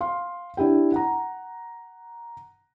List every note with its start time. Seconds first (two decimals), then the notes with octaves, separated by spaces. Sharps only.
0.01 F5 C6
0.57 D4 E4 G4 G5
0.92 F#5 A#5